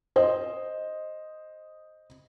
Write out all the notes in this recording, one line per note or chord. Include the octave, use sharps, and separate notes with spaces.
C5 D#5